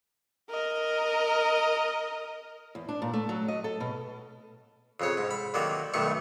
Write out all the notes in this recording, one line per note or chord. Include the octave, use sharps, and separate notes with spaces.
A#4 D#5
E2
D4
A#2
A3
F#3
D#5
A4
B2
F2 C#3 C#5
G#2
B5
D3 D#3 F#3 A#3 D5
B1 G2 D#3 A3 C#6